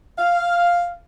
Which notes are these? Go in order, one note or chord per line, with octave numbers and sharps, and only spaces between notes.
F5